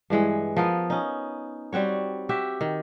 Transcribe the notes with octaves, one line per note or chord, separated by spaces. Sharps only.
G2 E3 G#3 F#5
F3 B3 A#4
C#4 D#4
G3 C4 F#4 C#5
F#4 G4 E5
D#3